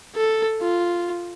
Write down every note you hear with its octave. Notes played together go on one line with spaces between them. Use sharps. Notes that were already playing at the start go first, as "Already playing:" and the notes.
A4
F4